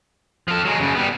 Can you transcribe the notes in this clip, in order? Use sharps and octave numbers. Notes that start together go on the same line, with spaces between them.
F3 A4
F#3 G#3
F#2 C#3
G3 B3